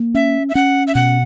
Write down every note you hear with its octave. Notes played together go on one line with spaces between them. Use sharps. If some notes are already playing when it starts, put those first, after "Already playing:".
Already playing: A#3
C#4 E5
E5
C#4 F#5
E5
B2 F#5